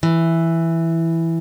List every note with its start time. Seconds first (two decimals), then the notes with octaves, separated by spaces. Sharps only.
0.03 E3